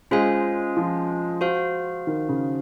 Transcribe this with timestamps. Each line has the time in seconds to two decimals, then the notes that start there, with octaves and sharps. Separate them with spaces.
0.11 G#3 C#4 F4 C5 F5 G#5
0.77 F3
1.41 F#4 C5 F5
2.07 D#3
2.29 C#3